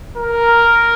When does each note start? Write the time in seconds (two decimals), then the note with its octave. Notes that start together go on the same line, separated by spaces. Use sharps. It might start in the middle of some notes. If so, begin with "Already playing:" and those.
0.17 A#4